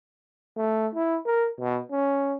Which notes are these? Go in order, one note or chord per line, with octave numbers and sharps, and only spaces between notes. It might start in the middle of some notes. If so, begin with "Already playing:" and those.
A3
E4
A#4
B2
C#4